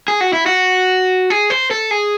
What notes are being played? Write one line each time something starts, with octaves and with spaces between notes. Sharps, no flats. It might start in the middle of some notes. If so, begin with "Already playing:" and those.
G#4
F#4
E4
F#4
G#4
C5
A4
G#4